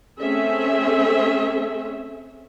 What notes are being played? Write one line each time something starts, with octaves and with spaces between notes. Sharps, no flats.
A3 C4 C#4 G#4 A4 E5